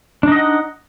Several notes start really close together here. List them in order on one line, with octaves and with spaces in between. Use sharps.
D4 D#4 D#5 F#5